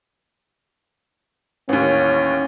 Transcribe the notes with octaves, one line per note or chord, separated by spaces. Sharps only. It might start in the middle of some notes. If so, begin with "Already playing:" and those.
A1 D#2 C#4